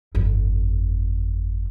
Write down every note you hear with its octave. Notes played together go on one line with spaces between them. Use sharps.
G1 F2